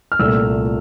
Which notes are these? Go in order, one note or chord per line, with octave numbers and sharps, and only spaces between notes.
F6
C2 A#2 A3 E6